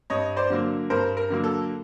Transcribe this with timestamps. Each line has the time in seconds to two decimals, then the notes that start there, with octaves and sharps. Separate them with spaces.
0.10 G2 C#5 D#5
0.36 C5 D5
0.50 D3 F#3 A#3
0.90 G2 A#4 C5
1.17 A#4
1.30 D3 F#3 A#3
1.44 A4